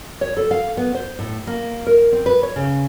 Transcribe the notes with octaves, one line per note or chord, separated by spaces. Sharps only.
C#5
A4
F5
B3
C5
A2
A#3
A#4
C4
B4
C#5
C#3